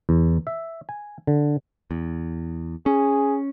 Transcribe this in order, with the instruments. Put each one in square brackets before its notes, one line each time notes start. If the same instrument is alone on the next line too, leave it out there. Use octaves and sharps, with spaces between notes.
[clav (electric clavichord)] E2
E5
G#5
D3
[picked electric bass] E2
[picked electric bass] C#4 [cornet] G#4